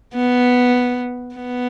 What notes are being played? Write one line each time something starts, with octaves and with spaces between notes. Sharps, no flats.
B3
B3